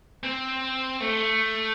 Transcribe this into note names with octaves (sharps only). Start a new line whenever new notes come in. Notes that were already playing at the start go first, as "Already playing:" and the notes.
C4
A3